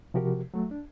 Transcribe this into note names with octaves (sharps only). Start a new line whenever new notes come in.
C3 F3 F#4 G4 A#4
F#3 A3
D4